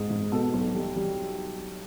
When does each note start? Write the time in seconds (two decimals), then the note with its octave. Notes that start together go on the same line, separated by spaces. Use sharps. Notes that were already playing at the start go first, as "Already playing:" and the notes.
Already playing: G#2 G#4
0.10 G#2
0.32 B2 A4
0.54 B1
0.74 G3
0.96 G3